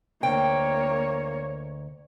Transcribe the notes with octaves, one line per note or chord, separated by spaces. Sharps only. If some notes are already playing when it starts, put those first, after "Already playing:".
D2 A#3 C#5 G5